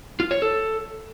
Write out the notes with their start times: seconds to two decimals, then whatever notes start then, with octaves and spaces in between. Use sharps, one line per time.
0.20 F4
0.31 C#5
0.42 A4